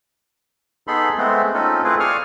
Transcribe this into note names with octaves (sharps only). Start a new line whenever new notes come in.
B3 D#4 G#4 A4 B5 C6
G#3 A3 B3 C4
C4 C#4 D#4 F4 A4
A3 C4 E4 F4 G#4 B4
D5 F5 C#6 D#6 F6